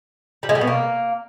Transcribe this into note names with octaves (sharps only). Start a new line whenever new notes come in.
G3
G#3
G3
B2
A#3